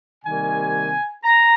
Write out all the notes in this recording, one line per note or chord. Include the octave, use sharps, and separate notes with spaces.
C3 D#3 G3 A#3 G#5
A#5